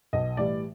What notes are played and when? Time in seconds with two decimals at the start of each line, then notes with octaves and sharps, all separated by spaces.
0.13 B1 D#5
0.37 A2 E3 G3 D5